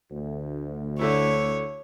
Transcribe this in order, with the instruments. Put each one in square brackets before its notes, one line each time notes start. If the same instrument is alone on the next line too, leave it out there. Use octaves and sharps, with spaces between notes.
[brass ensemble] D2
[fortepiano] D3 A3 E4 [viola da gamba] C#5